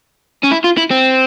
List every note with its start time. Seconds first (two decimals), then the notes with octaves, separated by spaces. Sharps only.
0.44 C#4
0.52 E4
0.64 F4
0.77 E4
0.90 C4